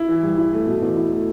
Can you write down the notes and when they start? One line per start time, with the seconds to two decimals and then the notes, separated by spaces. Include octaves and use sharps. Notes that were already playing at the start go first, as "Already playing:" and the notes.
Already playing: E4
0.09 E3
0.23 G2
0.38 E4
0.53 A3
0.67 B2
0.82 E2
0.97 E4
1.12 A3